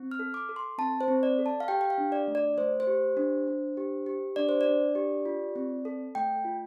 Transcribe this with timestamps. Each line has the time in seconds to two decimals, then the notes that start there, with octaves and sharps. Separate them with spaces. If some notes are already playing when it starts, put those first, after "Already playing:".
Already playing: C4
0.11 F6
0.19 A4
0.34 D6
0.49 A4
0.56 C6
0.78 C4 A5
1.01 C5
1.08 C4
1.23 D5
1.38 A4
1.46 A5
1.60 F5
1.68 G4 G5
1.81 G5
1.90 F5
1.98 D4
2.12 D5
2.28 A3
2.35 D5
2.57 A3 C5
2.80 C5
2.87 G4
3.17 D4
3.47 D4
3.77 G4
4.06 G4
4.36 D4 D5
4.49 C5
4.61 D5
4.66 D4
4.95 G4
5.25 F4
5.56 C4
5.85 A4
6.15 A3 G5
6.45 F4